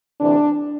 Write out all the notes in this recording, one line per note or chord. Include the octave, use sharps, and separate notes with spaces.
D2 C3 E3 D4